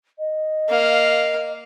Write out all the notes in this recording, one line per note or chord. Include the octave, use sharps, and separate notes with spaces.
D#5
A#3 F5